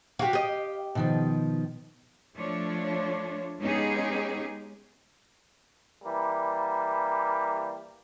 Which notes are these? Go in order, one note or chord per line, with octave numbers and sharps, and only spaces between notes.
F#4 G4 F5 G5
G4 D#5
B2 D#3 F3
F3 A3 D4 F4 C#5
G#3 B3 C#4 D#4 G4 G#4
E3 G3 A#3